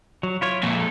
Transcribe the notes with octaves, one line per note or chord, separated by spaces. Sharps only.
F#3
E4 F4 C#5
F2 A#2 A4